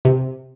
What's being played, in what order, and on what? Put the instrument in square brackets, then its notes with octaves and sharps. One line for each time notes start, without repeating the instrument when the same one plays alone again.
[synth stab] C3